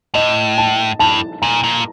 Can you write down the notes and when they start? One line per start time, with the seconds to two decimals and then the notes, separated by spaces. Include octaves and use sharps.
0.14 A2 D#5
0.58 A5
0.99 G2 A5
1.42 A#2 A#5
1.63 A#2